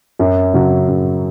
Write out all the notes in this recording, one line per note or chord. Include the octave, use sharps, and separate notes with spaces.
F#2
C#3 F#3
F#2